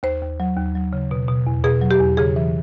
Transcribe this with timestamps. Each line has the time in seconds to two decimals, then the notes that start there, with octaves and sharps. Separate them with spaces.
0.03 D#2 C5
0.22 D#2
0.40 F#3
0.57 D#2
0.75 F#3
0.93 C#3
1.11 B2
1.28 B2
1.47 E2
1.64 B2 G#4
1.81 F#3
1.91 G4
2.00 E2
2.17 C#3 G#4
2.36 E3